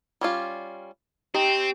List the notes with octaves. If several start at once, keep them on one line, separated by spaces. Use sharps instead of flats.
G3 C#4 F4
C4 D#4 G4 G5